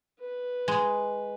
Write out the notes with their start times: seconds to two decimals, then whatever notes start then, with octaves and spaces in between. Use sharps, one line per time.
0.20 B4
0.68 G#3